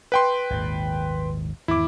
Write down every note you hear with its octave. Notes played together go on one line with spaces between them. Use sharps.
B4 G5 C6
G#1 D#2 A#2
E2 G#2 D#3 E4 D6